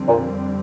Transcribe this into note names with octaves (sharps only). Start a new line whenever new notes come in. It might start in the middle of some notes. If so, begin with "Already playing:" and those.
Already playing: F2 D3 G3 C4
A#2